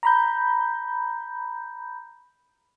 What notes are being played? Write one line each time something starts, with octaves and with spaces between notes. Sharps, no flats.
A#5 B5 G6